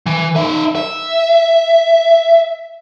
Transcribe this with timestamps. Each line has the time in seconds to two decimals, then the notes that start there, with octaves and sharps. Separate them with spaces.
0.06 E3
0.36 D#4 E5
0.75 E5